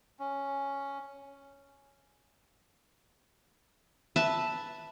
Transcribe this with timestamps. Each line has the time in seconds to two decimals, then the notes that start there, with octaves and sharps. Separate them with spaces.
0.19 C#4
4.16 B4 E5 A5